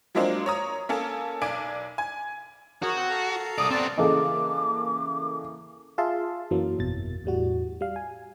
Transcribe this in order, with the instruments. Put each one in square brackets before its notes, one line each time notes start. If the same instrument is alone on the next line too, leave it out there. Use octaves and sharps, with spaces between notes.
[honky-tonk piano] F3 F#3 G#3 A#3 C4 D4
C#5 A#5 D#6
A#3 C#4 A4
B1 D5 G#5 D7
G#5
[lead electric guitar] F#4 [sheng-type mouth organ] G#4 A#4 C#5
[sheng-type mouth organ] C4 G6
A4 F5 A#5
[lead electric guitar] C2 D5 [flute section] D#6
[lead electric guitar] B3 C4 [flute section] D5
[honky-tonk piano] C#3 E3 A#3 [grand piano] G#4 A4 D#5 [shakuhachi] D6
[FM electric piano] F4 G#4 E5 F5 A5 C6
F#2 E3 F#3 A#3
G1 F2 B2 A6
E2 A2 G3 F#4
G3 F5
G#5